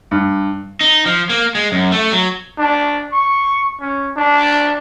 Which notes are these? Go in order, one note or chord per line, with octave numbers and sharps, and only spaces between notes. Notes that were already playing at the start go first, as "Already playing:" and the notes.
G2
D#4
F3
A#3
G#3
F#2
A3
F#3
D4
C#6
C#4
D4